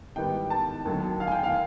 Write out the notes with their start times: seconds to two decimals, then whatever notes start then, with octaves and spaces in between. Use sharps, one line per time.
0.16 G#2 D#3 G3 B3 G5
0.50 A5
0.85 D#2 D3 F#3
1.20 F5
1.27 G#5
1.32 G5
1.43 F5